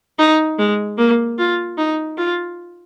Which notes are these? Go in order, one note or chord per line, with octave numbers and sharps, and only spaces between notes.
D#4
G#3
A#3
F4
D#4
F4